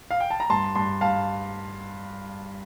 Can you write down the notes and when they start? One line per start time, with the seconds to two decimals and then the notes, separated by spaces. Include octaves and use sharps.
0.11 F5
0.20 G5
0.31 A5
0.40 A#5
0.50 G2 A5 C6
0.75 G2 A5 C6
1.01 G2 F5 A5